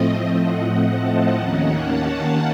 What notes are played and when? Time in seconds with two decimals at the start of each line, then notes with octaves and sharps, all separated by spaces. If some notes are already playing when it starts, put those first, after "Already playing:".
Already playing: A2 F3 A3 C4 D#5
0.40 F#5
0.87 A5
1.35 D#2 D#3 A#3 C#4 F#5
1.83 A5